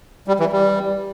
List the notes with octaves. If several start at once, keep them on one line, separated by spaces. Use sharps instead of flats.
G3
E3
G3